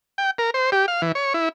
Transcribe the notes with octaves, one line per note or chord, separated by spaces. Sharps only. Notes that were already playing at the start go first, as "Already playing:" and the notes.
G5
A#4
C5
G4
F5
E3
C#5
E4